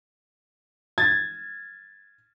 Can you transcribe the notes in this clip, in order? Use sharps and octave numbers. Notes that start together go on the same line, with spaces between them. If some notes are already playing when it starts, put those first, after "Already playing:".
G#6 A6